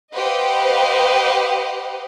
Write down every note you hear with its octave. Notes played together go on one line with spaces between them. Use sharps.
G4 B4 C5 D#5 F5 F#5